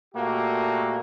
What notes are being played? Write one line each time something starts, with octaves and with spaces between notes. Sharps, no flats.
A#2 A3 A#3 F#4 G4